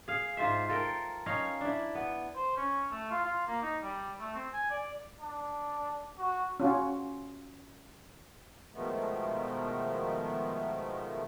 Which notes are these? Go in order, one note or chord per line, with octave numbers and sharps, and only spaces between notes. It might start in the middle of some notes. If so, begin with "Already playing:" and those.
G#4 F5
G#2 F4 C5 E5
F4 A4 A#4 G5
C#4 D#4 C#5 F5
D4 E4
B3
C5
C#4
A3
F4
F4
A#3
D#4
G3
A3
C4
G#5
D5
D4
F#4
C#4 F4 F#4
B2 D#3 F3 G#3 A3 B3